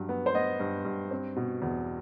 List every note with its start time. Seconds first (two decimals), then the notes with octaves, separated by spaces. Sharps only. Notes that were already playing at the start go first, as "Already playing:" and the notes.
Already playing: G2 F#3
0.09 B3
0.26 C5
0.34 B3 D#5
0.60 G2
0.85 G2
1.11 C4
1.36 B2
1.62 E2